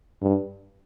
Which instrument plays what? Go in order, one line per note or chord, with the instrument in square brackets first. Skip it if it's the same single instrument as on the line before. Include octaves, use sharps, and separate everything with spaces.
[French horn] G2